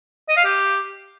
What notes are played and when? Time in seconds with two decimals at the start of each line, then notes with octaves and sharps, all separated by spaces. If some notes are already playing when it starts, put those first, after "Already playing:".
0.29 D#5
0.37 F5
0.45 G4